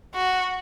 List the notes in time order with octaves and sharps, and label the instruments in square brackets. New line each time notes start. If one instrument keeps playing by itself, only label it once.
[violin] F#4